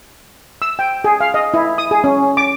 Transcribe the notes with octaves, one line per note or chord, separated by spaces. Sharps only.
E6
G5
G#4
F5
D#5
E4
D#6
G#4
C#4
D6